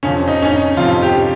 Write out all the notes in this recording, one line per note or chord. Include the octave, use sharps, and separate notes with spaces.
F2 C3 F3 C#4
D#4
C#4
D#4
F2 C3 F3 F4
G4